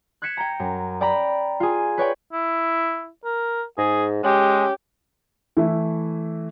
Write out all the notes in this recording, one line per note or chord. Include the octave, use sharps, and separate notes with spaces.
F#6 G#6 B6 C#7 E7
G5 A#5
F#2
D5 G5 A#5 B5
F4 G#4
B4 C#5 D5 G5
E4
A#4
G#2 G#4
G#3 C#4 G4
E3 A3 E4